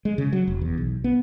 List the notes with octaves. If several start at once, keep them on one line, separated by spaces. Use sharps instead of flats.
G#3
C#3
F#3
F1
E2
B1
B3